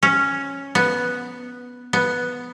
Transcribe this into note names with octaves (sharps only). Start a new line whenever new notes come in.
C#4
B3
B3